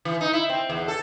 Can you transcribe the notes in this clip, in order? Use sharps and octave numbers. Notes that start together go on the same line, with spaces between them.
E3
D#4
E4
C4
E2
A4